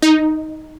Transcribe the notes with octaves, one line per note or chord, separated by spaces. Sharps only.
D#4